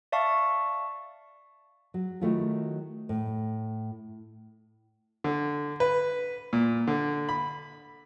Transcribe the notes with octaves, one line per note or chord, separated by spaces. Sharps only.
D5 E5 F5 A5 C#6
F#3
D#3 F#3 A3 E4 F4
A2
D3
B4
A#2
D3
B5